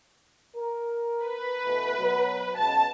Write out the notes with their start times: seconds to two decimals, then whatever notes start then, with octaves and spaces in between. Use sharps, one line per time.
0.57 A#4
1.24 B4
1.65 B2 E3 A3
1.98 B2 F#3
2.58 C#2 B2 A5